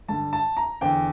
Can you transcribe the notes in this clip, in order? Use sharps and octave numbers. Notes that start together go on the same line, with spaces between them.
G2 D3 A5
A5
A#5
E2 D3 G5